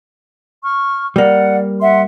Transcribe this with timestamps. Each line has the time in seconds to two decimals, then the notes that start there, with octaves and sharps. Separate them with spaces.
0.63 C#6 F6
1.16 G3 A#3 D5 F#5
1.80 E5 F#5 C6